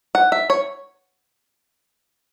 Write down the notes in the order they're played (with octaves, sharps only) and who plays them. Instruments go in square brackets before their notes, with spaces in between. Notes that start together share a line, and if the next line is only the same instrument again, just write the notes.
[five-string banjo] F#5
E5
C#5